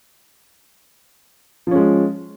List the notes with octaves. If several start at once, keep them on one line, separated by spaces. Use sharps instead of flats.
F3 G#3 C#4